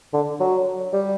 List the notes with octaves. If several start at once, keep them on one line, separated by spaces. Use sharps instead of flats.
D3
F#3
G3